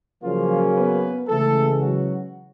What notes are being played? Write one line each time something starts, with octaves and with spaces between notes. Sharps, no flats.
C#3 F3 F#3 A#3 C#4 F4
B3 B4
C#3 E3 G#3 A3 A4
F#3 F#4